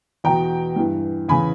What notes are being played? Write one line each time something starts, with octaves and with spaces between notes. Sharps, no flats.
E2 B2 G5 A#5
G2 E3
E2 C#3 E3 G#5 B5